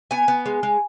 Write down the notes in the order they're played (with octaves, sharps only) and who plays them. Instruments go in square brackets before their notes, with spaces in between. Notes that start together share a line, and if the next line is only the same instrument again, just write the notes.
[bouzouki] B3 G#5
B3
G#3
G#3